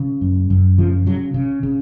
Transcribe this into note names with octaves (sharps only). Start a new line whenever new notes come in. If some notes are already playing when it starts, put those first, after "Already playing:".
Already playing: C#3
F#2
F#2
C#3 F3
C#3 F#3
C#3
C#3